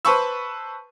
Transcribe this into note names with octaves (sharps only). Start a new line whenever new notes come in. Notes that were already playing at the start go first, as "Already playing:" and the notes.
B4 C5 A5 B5 C#6 E6